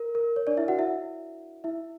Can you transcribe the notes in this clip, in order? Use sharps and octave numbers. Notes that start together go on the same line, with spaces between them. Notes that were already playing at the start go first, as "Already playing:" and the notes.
Already playing: A#4
A#4
C#5
D4 D5
E4 E5
F#4 F#5
E4 E5
E4 E5